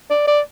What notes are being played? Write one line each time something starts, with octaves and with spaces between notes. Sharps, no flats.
D5
D5